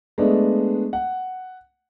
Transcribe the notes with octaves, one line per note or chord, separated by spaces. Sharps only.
G#3 A3 B3 D4
F#5